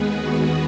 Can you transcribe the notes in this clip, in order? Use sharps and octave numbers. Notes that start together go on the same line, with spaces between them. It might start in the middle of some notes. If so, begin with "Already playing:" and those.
Already playing: D#2 D#3 G#3 B3 G#4 B4
F#4